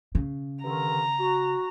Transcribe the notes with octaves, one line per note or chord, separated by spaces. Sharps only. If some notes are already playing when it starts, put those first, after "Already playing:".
C#3
G2 D3 D#3 A#5
F#4